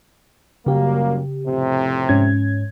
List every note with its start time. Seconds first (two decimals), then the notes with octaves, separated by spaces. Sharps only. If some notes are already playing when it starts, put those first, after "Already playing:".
0.66 F#2 C#3 G3 A#3 G4
1.46 F2 A2 C3
2.09 G#2 C#4 G#6